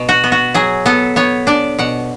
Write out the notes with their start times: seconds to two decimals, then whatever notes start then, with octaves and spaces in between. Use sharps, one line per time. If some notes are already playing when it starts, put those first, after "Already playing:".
Already playing: B2
0.09 F#4
0.24 B3
0.32 F#4
0.54 F#3 G#4
0.86 B3 A4
1.16 B3 C#5
1.47 D4 D5
1.79 B2 F#5